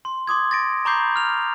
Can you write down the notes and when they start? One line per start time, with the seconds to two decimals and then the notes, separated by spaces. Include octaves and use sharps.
0.05 C6
0.27 C6 D6 D#6 G#6
0.51 A6 A#6 D7
0.85 A#5 B5 C#6 D6 G6 C7
1.16 F6 F7